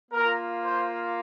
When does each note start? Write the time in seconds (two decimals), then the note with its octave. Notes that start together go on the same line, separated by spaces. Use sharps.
0.12 A#3 F4 A#4
0.62 C5